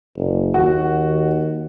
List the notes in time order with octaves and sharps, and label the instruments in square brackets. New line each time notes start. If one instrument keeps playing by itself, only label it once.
[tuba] F#1
[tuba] D#2 [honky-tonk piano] F#4